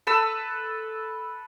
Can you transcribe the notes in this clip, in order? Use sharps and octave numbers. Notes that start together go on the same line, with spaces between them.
A4 B4 E6